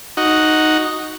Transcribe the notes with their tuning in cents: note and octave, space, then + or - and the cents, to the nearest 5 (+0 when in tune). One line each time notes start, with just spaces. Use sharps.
D#4 +0 F#4 +0